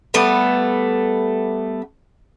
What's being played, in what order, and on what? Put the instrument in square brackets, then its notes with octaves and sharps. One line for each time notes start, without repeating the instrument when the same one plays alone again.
[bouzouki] G3 A3 B3